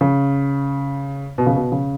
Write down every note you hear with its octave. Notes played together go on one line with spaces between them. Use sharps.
C#3
B2
C#3
B2
C#3